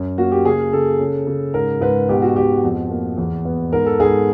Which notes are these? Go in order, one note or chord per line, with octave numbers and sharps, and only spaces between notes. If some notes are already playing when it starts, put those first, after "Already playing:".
Already playing: F#2
A#3 F#4
G4
C#3 G#4
C#3 A4
C#3
C#3
G#2 A#4
G#2 B4
B2 G4
F#4
B2 G4
F2
A#3
E2
B3
G#2 A#4
A4
G#2 G#4